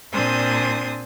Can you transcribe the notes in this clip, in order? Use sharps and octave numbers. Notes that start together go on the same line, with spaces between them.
A#2 C4 D4 C5 G#5 D#6